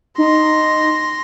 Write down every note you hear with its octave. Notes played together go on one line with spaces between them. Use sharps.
D#4 C6 A#6